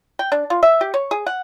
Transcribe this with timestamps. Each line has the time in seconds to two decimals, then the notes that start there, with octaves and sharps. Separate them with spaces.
0.19 G5
0.32 D4
0.50 F4
0.63 E5
0.81 G4
0.94 C#5
1.11 G#4
1.26 F#5